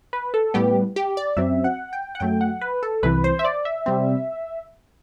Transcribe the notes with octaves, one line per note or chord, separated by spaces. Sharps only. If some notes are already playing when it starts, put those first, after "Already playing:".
B4
A4
A2 G3 B3 G4
G4
D5
F#2 F#3 C4 E5
F#5
G5
F#5
F#2 F#3 A3 G5
F#5
B4
A4
C2 C3 E3 B4
C5
E5
D5
E5
C3 G3 C4